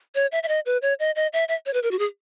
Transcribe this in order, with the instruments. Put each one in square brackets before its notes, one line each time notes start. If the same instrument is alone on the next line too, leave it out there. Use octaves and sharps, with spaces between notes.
[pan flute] C#5
E5
E5
D#5
B4
C#5
D#5
D#5
E5
E5
C#5
B4
A#4
F#4
G#4